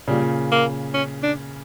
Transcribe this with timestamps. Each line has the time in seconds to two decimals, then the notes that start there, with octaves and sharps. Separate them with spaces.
0.08 A#2 C#3 G3
0.52 A#3
0.94 C#4
1.23 D4